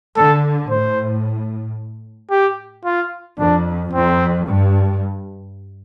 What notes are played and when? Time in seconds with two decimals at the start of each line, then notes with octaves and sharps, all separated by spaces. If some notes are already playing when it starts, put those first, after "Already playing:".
0.16 D3 A4
0.70 A2 C5
2.31 G4
2.85 F4
3.39 F2 D4
3.93 F2 C4
4.47 G2